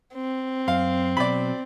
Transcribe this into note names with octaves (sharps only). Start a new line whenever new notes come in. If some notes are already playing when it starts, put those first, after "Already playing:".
C4
F#2 F5
B2 F#3 D5 B5